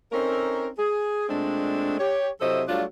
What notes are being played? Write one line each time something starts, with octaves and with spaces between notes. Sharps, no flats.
C4 C#4 D#4 A4 A#4
G#4
A#2 G#3 A3 C4 D4
G4 C#5
C3 F#3 E4 A4 C5 D#5
F#3 G3 A3 D4 F4